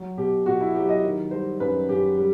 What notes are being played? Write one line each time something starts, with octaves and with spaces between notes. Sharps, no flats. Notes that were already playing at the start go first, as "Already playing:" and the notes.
Already playing: F#3
B2 G4
B2 F#4
E4
F#3 G4
D#5
D#3
G3 C5
F#2 B4
F#2 G4
G3